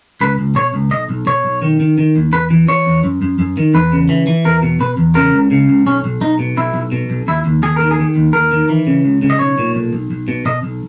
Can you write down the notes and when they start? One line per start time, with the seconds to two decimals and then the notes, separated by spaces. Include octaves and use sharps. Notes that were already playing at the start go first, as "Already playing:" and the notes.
0.21 C#2 B4
0.39 C#2
0.55 B2 C#5
0.74 C#2
0.91 B1 D#5
1.09 B1
1.27 B2 C#5
1.44 B1
1.62 D#3
1.80 D#3
1.98 D#3
2.16 D#2
2.32 E2 B4
2.50 E3
2.68 E3 C#5
2.86 E2
3.04 F#2
3.22 F#2
3.39 F#2
3.57 D#3
3.74 E2 B4
3.92 C#3
4.09 E3
4.27 E3
4.45 E2 A#4
4.62 B2
4.80 B2 B4
4.97 E2
5.15 C#3 A#4
5.33 C#2
5.51 C#3
5.69 C#2
5.86 B1 C#4
6.04 B1
6.21 B1 D#4
6.39 B2
6.57 B1 E4
6.74 B1
6.92 B2
7.10 B1
7.28 D#2 E4
7.45 D#2
7.62 D#2 G#4
7.76 D#3 A#4
7.91 G#4
7.99 D#3
8.16 D#2
8.33 D#2 A#4
8.51 D#3
8.69 E3
8.87 C#3
9.04 C#2
9.22 C#3
9.30 D#5
9.39 B1 C#5
9.58 A#2
9.75 B1
9.93 B1
10.11 B1
10.28 B2
10.45 B2 D#5
10.63 B1